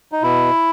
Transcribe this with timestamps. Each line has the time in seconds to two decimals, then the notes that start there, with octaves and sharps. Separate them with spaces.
0.12 D#4
0.22 B2 E4